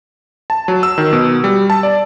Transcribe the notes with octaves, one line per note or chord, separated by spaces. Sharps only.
A5
F#3
E6
D#3
B2
G3
A5
D5